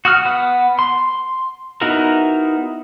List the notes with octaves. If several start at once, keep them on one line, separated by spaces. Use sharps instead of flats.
F#4 D#6 F6
B3 F#5
C6
B3 D#4 E4 F#4 A#4